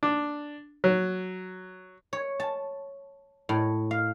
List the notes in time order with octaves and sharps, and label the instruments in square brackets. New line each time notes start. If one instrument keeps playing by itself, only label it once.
[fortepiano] D4
F#3
[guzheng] C#5
A5
A2
F5